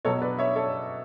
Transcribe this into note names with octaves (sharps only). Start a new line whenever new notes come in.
B2 F#3 A4 C#5
B4 D5
C#5 E5
A4 C#5